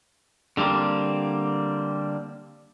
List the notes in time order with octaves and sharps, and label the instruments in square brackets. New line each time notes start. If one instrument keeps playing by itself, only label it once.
[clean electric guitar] D3 G3 A#3 C4